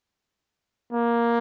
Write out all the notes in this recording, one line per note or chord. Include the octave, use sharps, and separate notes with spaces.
A#3